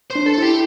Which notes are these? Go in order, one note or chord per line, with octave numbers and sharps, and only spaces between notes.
C5
D4
A4
E4 G4